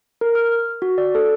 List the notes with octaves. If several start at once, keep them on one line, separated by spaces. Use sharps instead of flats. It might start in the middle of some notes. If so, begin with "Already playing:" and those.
A#4
F6
F#4
D5
A4